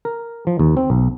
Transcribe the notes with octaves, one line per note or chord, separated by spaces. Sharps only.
A#4
F3
D#2
C4
B1